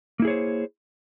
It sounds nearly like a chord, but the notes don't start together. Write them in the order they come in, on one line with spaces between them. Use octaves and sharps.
A#3 E4 G#4 C#5 C5